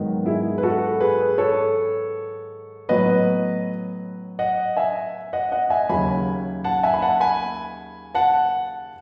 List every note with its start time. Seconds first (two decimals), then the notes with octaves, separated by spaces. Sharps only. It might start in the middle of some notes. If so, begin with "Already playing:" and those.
Already playing: G#2 D#3 F#3 B3
0.26 E4 G#4
0.58 B4
0.63 F#4 A4
1.00 G#4 B4
1.38 A4 C#5
2.89 A2 F#3 B3 B4 D#5
4.39 D#5 F#5
4.77 E5 G#5
5.33 D#5 F#5
5.52 D#5 F#5
5.70 E5 G#5
5.89 D#2 C#3 F#3 G#5 B5
6.64 F#5 A5
6.83 E5 G#5
6.94 B5
7.02 F#5 A5
7.20 G#5 B5
8.15 F#5 A5